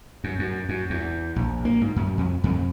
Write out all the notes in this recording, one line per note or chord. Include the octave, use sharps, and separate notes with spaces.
F#2
F#2
F#2
E2
A#1
A#3
G#2
F#2
F2
F2